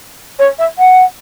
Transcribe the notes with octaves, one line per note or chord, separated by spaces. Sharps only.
C#5
E5
F#5